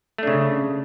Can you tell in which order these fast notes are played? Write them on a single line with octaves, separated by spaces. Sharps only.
A3 D4 C#3